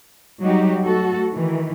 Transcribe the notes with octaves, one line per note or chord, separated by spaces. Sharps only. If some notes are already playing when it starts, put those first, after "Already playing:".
F#3 G3 D#4 F#4 G4
A3 F#4 A4
D#3 E3